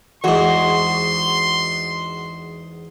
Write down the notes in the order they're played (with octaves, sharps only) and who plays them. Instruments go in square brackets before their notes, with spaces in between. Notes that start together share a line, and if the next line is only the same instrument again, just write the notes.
[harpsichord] E2 G#2 [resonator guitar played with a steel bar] F#4 [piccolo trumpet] C6